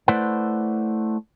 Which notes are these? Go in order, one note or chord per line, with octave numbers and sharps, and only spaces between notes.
A3 E4 B4 C5 D5 F#5